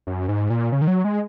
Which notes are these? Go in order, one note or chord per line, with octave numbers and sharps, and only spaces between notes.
F#2
G#2
A#2
C#3
D#3
F#3
G#3